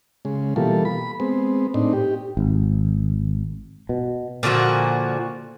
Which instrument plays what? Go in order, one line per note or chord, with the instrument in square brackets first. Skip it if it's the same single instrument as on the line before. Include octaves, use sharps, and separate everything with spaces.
[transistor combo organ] C#3 G#3
B2 E3 G3 A#3 F4 A4
B5
G#3 B3 C4
A2 C4 D4 D#4
G4
[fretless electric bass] G#1
B2
[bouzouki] A#2 D3 F3 F#4